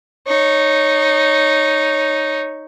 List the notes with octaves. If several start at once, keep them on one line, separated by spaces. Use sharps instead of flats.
D#4 C#5